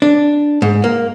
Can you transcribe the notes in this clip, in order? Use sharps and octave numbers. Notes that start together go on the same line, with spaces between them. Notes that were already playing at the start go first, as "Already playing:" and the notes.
D4
G#2
A#3